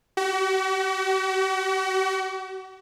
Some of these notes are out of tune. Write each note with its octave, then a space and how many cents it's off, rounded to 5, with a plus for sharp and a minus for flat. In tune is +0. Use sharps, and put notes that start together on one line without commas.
F#4 +45